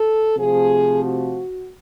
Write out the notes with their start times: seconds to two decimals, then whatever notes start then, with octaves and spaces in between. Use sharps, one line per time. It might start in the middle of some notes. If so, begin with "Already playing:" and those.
Already playing: A4
0.37 C3 F3 A3 G#4
1.02 F#4